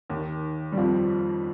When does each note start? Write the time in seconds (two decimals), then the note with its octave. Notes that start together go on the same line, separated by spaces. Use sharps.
0.10 D#2 D#3
0.72 G3
0.77 F2 F3